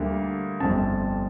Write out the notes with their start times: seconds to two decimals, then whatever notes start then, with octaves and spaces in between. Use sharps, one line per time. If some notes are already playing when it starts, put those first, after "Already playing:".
Already playing: D2 D3 G3 A#3 D4
0.60 G1 F2 C3 A5